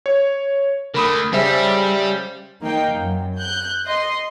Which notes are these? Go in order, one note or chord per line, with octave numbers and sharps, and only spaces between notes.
C#5
D3 A3 A#4 B5 D#6
C#3 G3 C5 E5
D#3 A#3 D#4 G5
F#2
F#6 G6
D#5 C6